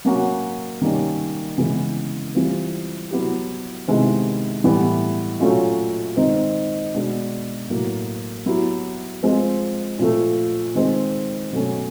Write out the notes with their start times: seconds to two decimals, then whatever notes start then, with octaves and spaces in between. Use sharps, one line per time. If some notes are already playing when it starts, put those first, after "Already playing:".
0.05 F#3 A#3 C#4 F#4
0.81 D#3 G3 A#3 C#4
1.57 C#3 E3 G#3 B3 E4
2.35 E3 G3 C4 F4
3.11 F#3 B3 E4 G4
3.88 C3 D#3 G#3 B3 E4
4.64 A2 E3 G3 B3
5.40 A#2 F#3 A3 C#4 F4
6.16 D#3 G#3 C4 D#4
6.94 B2 G#3 B3 D4
7.70 A2 F#3 A#3
8.46 F#3 B3 E4 G4
9.23 F3 G#3 C4
9.99 A#2 F3 A3
10.75 D#3 G#3 C4
11.52 B2 F#3 A3 C#4